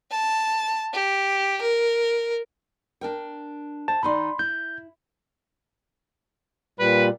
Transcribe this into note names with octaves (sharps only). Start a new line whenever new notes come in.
A5
G4
A#4
D4 A#4 G5
C5 A5
D#3 D#4 D5 B5 C6
E4 G6
A#2 G3 B4